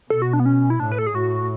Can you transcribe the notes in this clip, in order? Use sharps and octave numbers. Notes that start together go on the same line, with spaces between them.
B2 A4
F#4
D4
B3
C#4
E4
A2 D4
B4
A4
G#4
A2 F#4